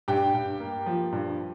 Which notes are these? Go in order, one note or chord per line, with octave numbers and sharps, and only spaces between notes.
G2 G4 G5
G2
A#3
F3
G2